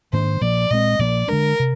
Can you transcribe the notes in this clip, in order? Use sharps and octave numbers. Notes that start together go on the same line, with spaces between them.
G#2 D#3 A#3 D4 C5
A#2 F3 A#3 D5
A#2 G#3 C4 D#5
A#2 F3 A#3 D5
D3 G#3 D4 A#4
C3